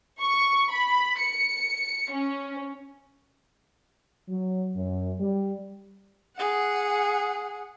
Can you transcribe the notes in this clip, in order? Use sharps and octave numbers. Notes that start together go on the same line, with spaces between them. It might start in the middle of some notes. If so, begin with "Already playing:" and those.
C#6
B5
C#7
C#4
F#3
F#2
G3
G#4 F#5